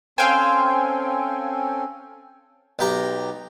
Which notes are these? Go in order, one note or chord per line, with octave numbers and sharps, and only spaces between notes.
C4 C#4 A4 C5 F5 G5 G#5
B1 G4 A#5